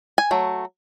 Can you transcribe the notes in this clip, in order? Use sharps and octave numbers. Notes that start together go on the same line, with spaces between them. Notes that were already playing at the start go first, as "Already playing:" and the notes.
G#5
F#3 A3